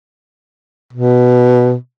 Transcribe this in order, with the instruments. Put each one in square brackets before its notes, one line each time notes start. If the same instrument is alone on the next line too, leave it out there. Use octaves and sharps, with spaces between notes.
[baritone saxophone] B2